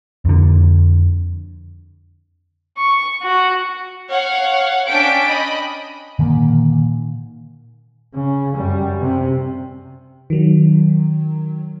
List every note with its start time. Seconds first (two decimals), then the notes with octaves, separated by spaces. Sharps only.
0.25 F2 D3
2.77 C#6
3.23 F#4
4.10 C#5 F5 F#5
4.89 C#4 D4 G5 B6 D7
5.27 D#5 B5
6.19 A#2 D3 D#3 A#3
8.14 C#3
8.57 F#2 G3
9.00 C3
10.30 D#3 F#3